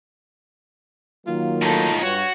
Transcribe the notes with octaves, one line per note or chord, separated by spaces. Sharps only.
D#3 F#3 A#3 F4
A2 D#4 A4
G2 F#4 C#5